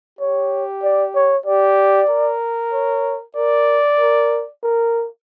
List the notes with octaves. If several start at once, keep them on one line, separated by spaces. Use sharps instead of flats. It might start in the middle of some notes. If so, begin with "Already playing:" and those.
G4 C#5
D5
C#5
G4 D5
A#4
C#5
A#4 D5
A#4
A#4